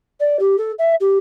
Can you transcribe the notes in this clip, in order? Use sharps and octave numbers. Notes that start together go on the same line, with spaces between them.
D5
G4
A4
E5
G4